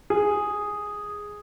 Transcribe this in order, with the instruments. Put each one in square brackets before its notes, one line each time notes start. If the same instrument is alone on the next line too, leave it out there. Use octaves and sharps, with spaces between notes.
[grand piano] G#4